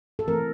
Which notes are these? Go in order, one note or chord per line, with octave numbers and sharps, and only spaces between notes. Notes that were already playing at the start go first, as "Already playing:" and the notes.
A4
E3 A3 C4 A#4